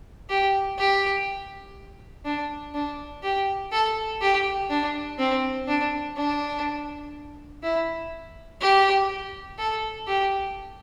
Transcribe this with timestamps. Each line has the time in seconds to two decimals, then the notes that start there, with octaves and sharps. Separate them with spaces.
0.29 G4
0.78 G4
2.25 D4
2.74 D4
3.23 G4
3.72 A4
4.21 G4
4.70 D4
5.19 C4
5.67 D4
6.16 D4
7.63 E4
8.61 G4
9.58 A4
10.08 G4